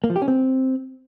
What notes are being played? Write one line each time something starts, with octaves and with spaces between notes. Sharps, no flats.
A#3
F3
G4
C#4
C4